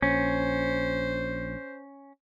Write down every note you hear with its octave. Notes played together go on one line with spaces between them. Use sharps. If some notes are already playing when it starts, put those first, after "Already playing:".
A#1 C#4 C5